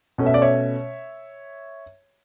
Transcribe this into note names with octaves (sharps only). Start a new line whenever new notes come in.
B2 A3 C#4
E5
D5
C#5 E5